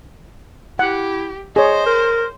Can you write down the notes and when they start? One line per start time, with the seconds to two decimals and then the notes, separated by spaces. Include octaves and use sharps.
0.79 E4 G4 F#5
1.56 G#4 C5 C#5 D#5
1.86 A#4